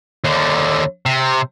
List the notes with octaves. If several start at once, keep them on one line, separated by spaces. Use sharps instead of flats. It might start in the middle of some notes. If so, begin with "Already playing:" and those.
D#2 D3
C3